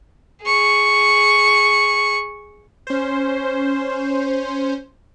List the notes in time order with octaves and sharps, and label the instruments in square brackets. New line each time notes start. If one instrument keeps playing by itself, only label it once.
[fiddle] G#4 C#6
[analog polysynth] C#4 C5